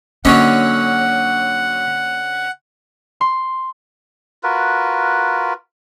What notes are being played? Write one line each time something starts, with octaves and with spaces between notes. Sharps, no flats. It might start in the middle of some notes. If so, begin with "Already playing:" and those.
D3 F#3 A#3 C#4 C#5 D#5 F#5
C6
F4 F#4 A#4 B4